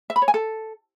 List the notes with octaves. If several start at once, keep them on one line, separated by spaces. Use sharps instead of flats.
E5
B5
C#5
G#5
A4